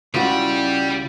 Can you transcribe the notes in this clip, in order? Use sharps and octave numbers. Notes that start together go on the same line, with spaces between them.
C#2 G3 C#4 E4 F#4 F5